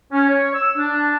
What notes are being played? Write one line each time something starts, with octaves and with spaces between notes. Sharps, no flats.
C#4
C#5
E6
D4